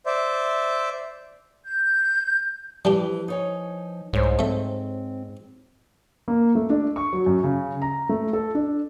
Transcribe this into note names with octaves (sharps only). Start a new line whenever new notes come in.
C5 D5 E5
G6
E3 F3 G3 D4 G4
D#4 C#5 G#5
C2 G#2 C5 C#5
A3 C4 E5
A#3
A3
D4
C#6
F#3
F#2
C#3
A#5
A3
A4
D4